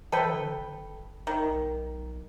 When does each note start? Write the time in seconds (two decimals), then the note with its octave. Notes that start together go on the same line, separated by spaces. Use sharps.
0.12 E3 A4 B4 G5
0.33 D3
0.57 F#1
1.27 D#3
1.47 B1